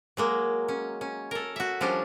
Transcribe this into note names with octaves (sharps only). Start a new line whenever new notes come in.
F#3 G#3 A#3
C#4
C#4
A4 A#4
F#4 E5
F3 G3 C#4 D4